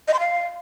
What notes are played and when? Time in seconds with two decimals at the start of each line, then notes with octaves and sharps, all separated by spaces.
0.08 D#5
0.14 C6
0.20 F5